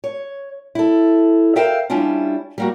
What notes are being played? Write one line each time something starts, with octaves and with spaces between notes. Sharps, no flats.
C#5
E4 A4
A#4 C5 E5 F5 G5
G3 C#4 D4 E4 F4
G3 A#3 F#4